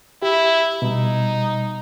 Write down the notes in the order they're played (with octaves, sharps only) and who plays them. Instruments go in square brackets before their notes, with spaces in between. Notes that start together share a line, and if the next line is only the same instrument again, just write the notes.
[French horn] E4 [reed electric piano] G4
[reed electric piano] B2 G3 [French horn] D#4